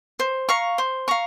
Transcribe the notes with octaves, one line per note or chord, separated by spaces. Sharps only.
C5
F5 A#5 C#6
C5
F5 A#5 C#6